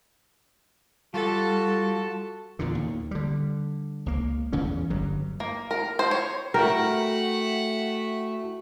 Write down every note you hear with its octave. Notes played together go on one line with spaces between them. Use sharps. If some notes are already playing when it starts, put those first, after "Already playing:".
G3 F4 F#4 A4 A5
E2 A#2 D3
D#2
D3 G3
C#2 A#3
E2 C#3 E3 C#4
G1 G2 F#3
A#3
A#4
C5
C#5
A3 E4 F#4 A#4 E5 F#5 G5